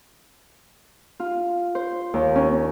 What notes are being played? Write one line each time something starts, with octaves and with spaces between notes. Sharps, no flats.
F4
C5
D#2
C#4